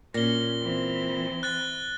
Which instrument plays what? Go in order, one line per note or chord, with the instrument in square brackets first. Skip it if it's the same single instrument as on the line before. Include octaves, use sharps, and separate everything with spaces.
[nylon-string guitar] A#2 [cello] C#4 [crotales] A#6 G7
[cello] E3 C4
[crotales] F#6 A6 G7